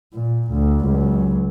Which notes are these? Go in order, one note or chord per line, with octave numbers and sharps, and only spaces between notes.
A#2
D2
C#2 F#3